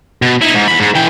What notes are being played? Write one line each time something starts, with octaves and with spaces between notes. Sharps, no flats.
B2
D#4 E4
G#2
E2 B5
G#2
E3 G5